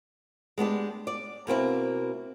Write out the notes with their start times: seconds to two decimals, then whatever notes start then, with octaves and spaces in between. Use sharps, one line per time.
0.58 G#3 B3 D4 G4
1.07 D5
1.47 B2 A#3 C4 E4